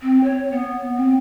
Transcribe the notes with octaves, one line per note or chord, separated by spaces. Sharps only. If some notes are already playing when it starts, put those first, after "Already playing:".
C4
C#5
B3
C4